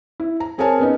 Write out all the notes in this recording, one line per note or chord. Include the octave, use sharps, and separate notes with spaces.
E4
A#5
C4 G#4 A#4 C#5 G#5 A5
B3 C#4 D#4